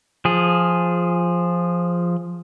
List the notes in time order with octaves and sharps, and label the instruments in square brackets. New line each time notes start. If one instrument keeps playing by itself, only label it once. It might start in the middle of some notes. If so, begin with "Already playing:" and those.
[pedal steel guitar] F3 G#4